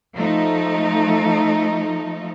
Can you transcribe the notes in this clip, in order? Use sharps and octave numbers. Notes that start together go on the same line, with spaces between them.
F3 A3 D#4